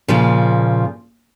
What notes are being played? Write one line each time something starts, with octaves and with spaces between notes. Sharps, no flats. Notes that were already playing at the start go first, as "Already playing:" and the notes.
A#2 C#3 F3